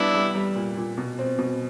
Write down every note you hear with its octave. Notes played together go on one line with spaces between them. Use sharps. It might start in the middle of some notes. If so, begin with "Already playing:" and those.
Already playing: G3 B3 D4 E4
G3
G3
A#2
A#2
B2
C4
B2